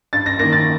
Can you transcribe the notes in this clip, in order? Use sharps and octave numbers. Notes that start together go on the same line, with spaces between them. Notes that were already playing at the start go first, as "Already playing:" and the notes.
G2 A6
A#6
D#3 A#3 A#6
A6